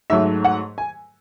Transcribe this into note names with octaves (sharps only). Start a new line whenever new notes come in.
G#2 F#3 A3 E5
F#5
G#5